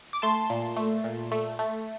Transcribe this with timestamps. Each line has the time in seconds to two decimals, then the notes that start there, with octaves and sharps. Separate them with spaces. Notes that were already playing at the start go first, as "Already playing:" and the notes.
0.13 D6
0.22 A3 A5 C6
0.50 A#2
0.77 A3
1.04 A#2
1.32 A3
1.59 A3